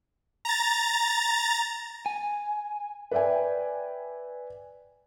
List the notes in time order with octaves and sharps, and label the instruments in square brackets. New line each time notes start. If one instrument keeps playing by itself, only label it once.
[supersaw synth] A#5 A6
[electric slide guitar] G#5
[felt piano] B4 D5 E5 G5 G#5